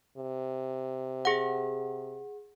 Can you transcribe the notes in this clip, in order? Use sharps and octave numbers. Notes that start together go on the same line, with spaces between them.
C3
G#4 F#5